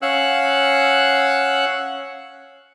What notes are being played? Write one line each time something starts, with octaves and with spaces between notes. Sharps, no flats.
C#4 F5 F#5 E6 F#6